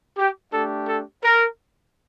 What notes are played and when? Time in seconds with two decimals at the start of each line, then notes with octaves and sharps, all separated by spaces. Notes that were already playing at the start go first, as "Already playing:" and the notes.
0.18 G4
0.53 A3 D4 G4 A4
0.88 A4
1.24 A#4